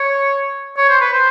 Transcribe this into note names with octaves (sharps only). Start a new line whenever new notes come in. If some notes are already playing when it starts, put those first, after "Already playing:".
Already playing: C#5
C#5
C5
B4
C5